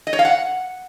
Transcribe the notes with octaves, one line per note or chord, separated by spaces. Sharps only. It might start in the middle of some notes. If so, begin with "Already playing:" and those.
D#5
C#5
F5
F#5